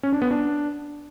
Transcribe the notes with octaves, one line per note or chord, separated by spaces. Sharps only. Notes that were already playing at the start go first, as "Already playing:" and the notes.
C#4
D4
B3
D4